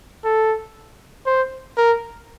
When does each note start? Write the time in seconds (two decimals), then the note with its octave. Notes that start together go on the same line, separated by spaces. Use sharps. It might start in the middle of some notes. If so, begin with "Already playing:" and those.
0.24 A4
1.26 C5
1.77 A#4